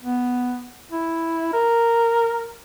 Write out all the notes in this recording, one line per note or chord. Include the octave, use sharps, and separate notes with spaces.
B3
E4
A#4